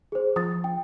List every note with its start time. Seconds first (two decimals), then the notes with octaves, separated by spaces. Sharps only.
0.12 G#4 C5
0.36 F3 D#6 A6
0.64 G5